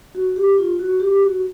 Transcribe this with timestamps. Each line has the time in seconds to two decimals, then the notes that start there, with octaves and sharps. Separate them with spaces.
0.15 F#4
0.36 G4
0.58 F4
0.79 F#4
1.00 G4
1.22 F#4